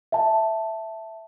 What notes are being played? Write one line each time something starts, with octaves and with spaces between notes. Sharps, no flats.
E5 A5